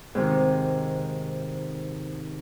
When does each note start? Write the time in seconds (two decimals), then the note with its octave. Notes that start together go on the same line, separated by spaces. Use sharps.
0.15 G#2 C3 D#3